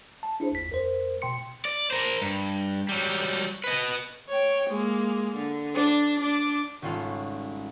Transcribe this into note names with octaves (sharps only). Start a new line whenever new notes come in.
A5
D4 E4 G#4 C5
G1 D#2 B6
F2 A#4 C5
B2 G5 C6 C#7
D5
A#4 C5
G2
F#3 G3
B4 D#5
C#5 G5
G#3 A#3
D3
D4
D4 D6
G#1 G3 C#4 F4 A4 F#6